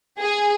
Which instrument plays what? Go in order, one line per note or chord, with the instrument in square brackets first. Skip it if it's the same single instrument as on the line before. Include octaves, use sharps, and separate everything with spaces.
[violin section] G#4